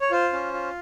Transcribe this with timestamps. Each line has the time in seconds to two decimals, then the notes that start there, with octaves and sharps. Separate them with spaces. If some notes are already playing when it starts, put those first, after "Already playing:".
0.01 C#5
0.11 F4 C5
0.33 C#4
0.54 F4